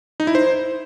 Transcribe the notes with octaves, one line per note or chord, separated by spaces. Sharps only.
D#4
E4
C5